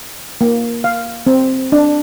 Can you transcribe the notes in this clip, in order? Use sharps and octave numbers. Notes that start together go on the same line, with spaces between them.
A#3
F5
C4
D4